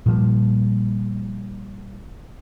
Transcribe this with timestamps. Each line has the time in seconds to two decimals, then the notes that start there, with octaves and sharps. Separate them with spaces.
0.06 A#2 F3 G3